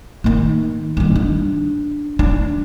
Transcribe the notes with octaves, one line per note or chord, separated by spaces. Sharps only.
D#3 A#3
G2 D#3
D4
D4